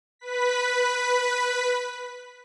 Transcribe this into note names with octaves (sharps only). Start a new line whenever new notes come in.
B4 B6